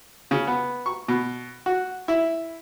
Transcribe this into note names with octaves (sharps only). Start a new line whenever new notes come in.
C#3
B3
C#6
B2
F#4
E4